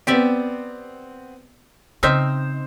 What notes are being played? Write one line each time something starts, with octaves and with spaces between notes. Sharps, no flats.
B3 C4 G4 D5 E5
C#3 C4 D#4 C5 E5 F6